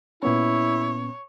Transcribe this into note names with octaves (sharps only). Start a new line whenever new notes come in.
A#2 B3 C#4 E4 C#5